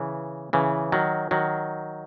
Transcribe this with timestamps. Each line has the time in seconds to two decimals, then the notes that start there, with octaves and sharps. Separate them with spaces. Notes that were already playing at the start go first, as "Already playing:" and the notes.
Already playing: C#3 E3
0.53 C#3 E3
0.92 D#3 F#3
1.31 D#3 F#3